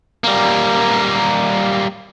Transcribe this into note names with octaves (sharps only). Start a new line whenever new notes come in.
G3 A#3